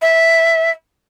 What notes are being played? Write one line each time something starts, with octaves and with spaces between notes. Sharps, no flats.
E5